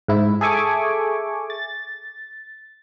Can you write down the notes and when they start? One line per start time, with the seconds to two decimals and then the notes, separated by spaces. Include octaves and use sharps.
0.08 G#2 E4
0.41 G#4 A4 E5 G#5 C#6 D6
1.50 A6